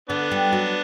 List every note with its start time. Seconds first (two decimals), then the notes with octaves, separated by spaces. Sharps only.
0.09 D3 B3 D4
0.32 G3
0.52 F#3